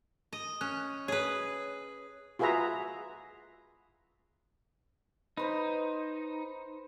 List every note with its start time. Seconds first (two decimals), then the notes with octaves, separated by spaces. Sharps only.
0.33 D#5
0.61 C#4 F#6
1.08 G#4 B4 C#5
2.39 F4 F#4 G#4 B4 E5 A#5
5.37 D#4 B4 C5 B5